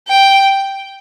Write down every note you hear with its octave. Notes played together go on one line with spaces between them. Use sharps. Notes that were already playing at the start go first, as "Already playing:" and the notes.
G5